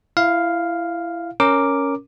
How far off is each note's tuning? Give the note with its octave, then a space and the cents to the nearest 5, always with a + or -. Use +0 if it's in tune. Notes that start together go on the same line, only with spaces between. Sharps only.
E4 +20 F5 +0
C#4 +5 A#4 +0 D6 +0